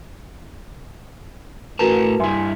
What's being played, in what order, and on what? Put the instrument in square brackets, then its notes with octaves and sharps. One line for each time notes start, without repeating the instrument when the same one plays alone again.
[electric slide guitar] A2 A5 A#5 [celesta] F#4 A#4 B4
[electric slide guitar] G2 E4 [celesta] E5 G#5 C6